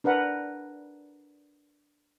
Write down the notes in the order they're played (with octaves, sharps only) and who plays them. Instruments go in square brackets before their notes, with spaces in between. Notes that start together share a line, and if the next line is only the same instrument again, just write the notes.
[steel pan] D4 A#4 B4 F#5